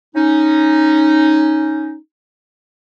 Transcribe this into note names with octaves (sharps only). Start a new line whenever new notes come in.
C#4 D#4